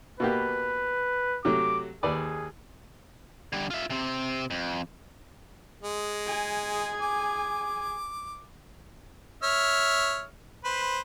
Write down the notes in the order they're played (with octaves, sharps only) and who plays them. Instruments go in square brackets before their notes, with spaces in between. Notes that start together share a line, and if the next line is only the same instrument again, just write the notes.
[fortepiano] B2 A#3 G4 [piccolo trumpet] B4
[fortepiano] C3 F#3 A3 [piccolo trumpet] D6
[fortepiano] D#2 B4 D5 [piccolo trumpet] G#4
[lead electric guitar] D3 G3
F4 E5
C3 C4
F2
[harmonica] G#3
[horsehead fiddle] G#4 G#5
[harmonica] D6
C#5 E5 F6
B4 C5